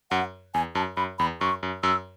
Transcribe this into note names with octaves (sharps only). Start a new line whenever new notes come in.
F#2 F#5
E2 G#5
F#2 A5
F#2 B5
E2 B5
F#2 C#6
F#2
F#2 E6